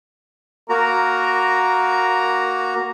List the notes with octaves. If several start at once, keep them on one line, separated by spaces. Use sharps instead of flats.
A#3 F#4 A#4 A#5